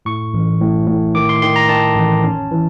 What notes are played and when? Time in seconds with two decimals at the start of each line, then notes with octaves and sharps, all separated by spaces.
0.05 A2 C#6
0.34 A1
0.61 A2
0.88 A2
1.15 D#3 D6
1.29 C6
1.42 D#3 C6
1.56 A#5
1.69 D#3 A5
1.96 A1
2.24 C#4
2.51 E3